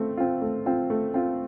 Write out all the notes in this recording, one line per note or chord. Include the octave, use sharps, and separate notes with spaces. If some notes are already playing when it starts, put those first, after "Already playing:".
Already playing: A3 C4 F4
C4 F4
A3
C4 F4
A3
C4 F4